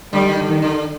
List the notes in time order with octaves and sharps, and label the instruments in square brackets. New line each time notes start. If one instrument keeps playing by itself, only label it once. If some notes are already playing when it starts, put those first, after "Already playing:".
[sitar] D3 [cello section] G3
[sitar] D#3
D3
[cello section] D#3
[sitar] D3